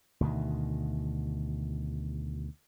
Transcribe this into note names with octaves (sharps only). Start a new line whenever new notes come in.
D2 B2 D#3